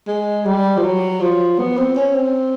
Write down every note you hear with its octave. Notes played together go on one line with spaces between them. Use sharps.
G#3
G3
F3
F#3
F3
B3
C4
C#4
C4